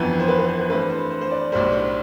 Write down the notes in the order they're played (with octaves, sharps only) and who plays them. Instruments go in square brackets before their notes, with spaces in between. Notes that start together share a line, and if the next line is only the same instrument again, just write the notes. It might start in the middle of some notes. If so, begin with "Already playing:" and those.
Already playing: [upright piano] G1 F2 E3 B3
C5
B4
B4
C5
B4
G2 E3 A3 C4 B4
C5
C5
C5
D5
B1 A2 G3 D4 C5
C5